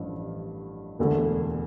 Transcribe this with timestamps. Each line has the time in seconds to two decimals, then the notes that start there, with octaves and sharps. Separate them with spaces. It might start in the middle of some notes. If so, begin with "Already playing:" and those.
Already playing: A1 G2 F3
0.99 E1 D2 D3 A3